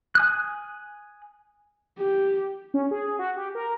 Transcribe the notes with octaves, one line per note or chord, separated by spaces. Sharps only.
G#5 D#6 F#6
G4
C#4
G#4
F#4
G4
A#4